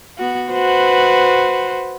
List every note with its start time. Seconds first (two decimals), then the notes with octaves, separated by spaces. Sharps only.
0.18 B3 F#4
0.51 F#4 B4 C5